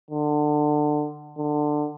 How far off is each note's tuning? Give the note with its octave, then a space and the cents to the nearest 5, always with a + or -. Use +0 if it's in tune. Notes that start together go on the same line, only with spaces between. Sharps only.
D3 +25
D3 +20